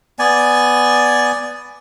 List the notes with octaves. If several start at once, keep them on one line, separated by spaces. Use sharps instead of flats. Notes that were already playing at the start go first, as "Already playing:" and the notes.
B3 D5 G#5